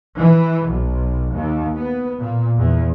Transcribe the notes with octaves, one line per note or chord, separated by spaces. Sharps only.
E3
B1
D#2
B3
A#2
E2